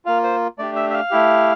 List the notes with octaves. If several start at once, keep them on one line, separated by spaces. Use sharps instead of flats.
A#3 F4 F5
C5
A3 D4 G4 D5
E5
E5
F5
A3 E4 G4